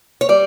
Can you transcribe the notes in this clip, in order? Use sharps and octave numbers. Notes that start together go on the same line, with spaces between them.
C#5
G3 D5